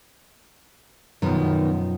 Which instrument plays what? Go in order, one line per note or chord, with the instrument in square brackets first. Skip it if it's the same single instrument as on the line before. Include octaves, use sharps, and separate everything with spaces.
[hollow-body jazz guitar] F#2 B2 F3 [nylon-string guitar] D#3 B3